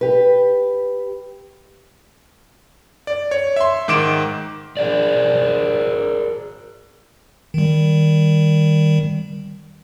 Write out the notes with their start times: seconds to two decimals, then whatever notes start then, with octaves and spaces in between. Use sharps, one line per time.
0.01 G4 B4
3.07 D5
3.31 C#5
3.56 E5 C6
3.88 G#2 D#3 D6 D7 E7
4.77 G#4 A#4 D5
7.54 D#3 G3